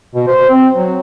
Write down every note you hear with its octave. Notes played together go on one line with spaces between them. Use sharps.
B2
C5
C4
F#3